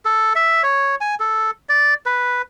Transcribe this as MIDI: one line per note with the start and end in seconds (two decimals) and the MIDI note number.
0.05 0.33 69
0.35 0.63 76
0.63 0.95 73
1.01 1.15 80
1.20 1.51 69
1.69 1.94 74
2.06 2.42 71